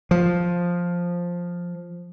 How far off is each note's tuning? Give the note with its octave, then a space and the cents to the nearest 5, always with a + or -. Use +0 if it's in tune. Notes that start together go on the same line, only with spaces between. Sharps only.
F3 +5